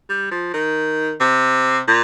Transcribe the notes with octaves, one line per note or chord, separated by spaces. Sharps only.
G3
F3
D#3
C3
A#2